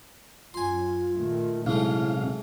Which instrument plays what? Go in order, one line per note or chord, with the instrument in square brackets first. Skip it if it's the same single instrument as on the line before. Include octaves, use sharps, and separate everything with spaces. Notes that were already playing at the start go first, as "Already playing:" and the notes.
[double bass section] F#2 [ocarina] F4 [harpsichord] G#5 C6
[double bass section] A#2 D#3 A3
[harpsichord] G#2 A3 [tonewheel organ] C3 F5 [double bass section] F#3 [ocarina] E4